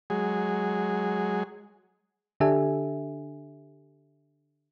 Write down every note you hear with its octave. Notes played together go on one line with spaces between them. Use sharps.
F#3 G#3 G#4
D3 D4 G4 A4 E5 G#5